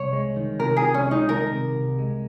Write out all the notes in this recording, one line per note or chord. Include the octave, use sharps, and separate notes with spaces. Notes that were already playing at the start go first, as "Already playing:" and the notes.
Already playing: C2 C#5
G#3
D#3
C3 A#4
G#4
C2
C#4
G#3
D#4
D#3 A#4
C3
C2
G#3